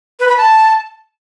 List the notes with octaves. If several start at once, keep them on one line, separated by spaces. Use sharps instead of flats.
B4
B5
A5